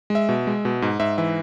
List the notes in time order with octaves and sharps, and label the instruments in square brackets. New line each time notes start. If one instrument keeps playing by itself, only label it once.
[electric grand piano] G#3
E5
B2
G#3
B2
G#2
G#2 E5
E3 E5